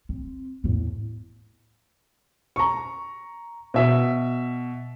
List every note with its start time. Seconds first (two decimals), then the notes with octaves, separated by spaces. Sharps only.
0.09 C4
0.64 E2 A2
2.56 A#5 C#6
3.74 B2 E5